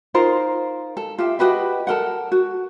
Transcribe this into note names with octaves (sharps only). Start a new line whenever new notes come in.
D#4 F4 A#4 C5
A4
F4 G4 E5
F#4 G4 B4 D#5
A4 A#4 F#5
F#4